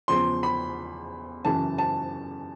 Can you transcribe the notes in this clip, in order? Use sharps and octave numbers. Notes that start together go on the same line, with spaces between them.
E2 C#3 F3 C6
B5
F#2 C#3 E3 A5
A5